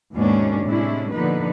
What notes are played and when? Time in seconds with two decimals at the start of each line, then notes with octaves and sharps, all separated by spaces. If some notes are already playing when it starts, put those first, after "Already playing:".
0.15 D#2 G#2 B2 A#3 C#4 D4
0.65 A2 C3 G#3 C#4 D4 E4
1.11 A#2 D3 F3 B3 D#4 B4